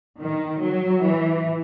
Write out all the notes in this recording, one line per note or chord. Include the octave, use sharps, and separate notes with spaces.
D#3
F#3
E3